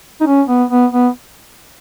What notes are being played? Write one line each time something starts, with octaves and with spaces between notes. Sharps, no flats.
D#4
C#4
B3
B3
B3